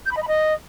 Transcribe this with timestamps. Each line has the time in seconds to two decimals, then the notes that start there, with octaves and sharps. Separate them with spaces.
0.05 G6
0.11 B5
0.16 D#5
0.22 B5
0.27 D#5